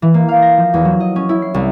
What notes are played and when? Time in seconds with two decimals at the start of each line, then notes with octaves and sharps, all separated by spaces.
0.02 E3
0.14 A#3
0.29 F5
0.42 A#6
0.57 F3
0.74 E2
0.85 F#3
1.00 D#5
1.16 C#4
1.29 E4
1.42 C7
1.54 C2